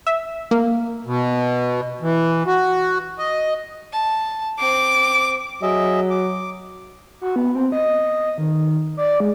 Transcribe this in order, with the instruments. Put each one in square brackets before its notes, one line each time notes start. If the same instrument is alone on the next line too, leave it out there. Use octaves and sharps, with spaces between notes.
[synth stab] E5
A#3
[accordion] B2
E3
F#4
D#5
[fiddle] A5
[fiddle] C4 [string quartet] D6
[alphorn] F#3 [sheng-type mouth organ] G#4 D#5 E5
[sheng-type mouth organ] D6
[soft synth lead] F#4
B3
C4
D#5
D#3
D5
G#3